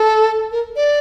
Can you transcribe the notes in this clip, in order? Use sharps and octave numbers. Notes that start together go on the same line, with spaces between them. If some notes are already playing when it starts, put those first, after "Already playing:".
Already playing: A4
A#4
D5